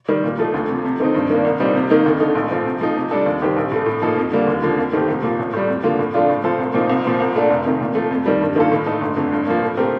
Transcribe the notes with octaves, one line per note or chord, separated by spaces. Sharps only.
D#3 G3
A#2
F3 A3 D#4
D2
C3 F3
C3
D#3 A3 C4 D#4
G2
D#3 A#3 D4
C2
A#2 G3 C4 D#4
C3
D#3 A#3 D#4
D2
D3 A3 D#4
A#1
A2 F3 C4
C3
F3 A3 D#4
C3
G3 D4 A4
D#2
D#3 G3 C4 G4
A#1
A2 A3
A2
F3 A#3 D#4 A4
F2
D3 G3 A#3
D#2
D3 F3 A#3
F2
D#3 A3 C4 G4
C2
A#2 F3
A1
A2 G3
F2
D3 F3 A#3 F4
A2
F3 A3 D4 F4
A2
F3 C4 F4 A4
C2
A#2 F3 C4 D#4
C2
A#2 F3 C4
C2
A#2 A3 D4
F1
F2 C3 D#3
A#2
F3 A3
F2
D#3 G3
G2
D#3 A#3 F4 A4
A2
A3 D#4 A4
G1
F2 D3 A3
G2
F3 A#3
A2
A3 C4 G4 A#4